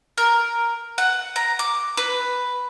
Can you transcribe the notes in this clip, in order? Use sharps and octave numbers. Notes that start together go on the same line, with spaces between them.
A#4
F#5
A#5
D6
B4